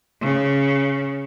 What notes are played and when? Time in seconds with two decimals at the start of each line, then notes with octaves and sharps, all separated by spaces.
0.22 C#3